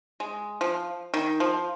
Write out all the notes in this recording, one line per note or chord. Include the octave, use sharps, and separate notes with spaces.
G#3
F3
D#3
F3